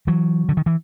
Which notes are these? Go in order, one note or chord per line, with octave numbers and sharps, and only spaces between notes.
E3 F#3
D3
D#3
E3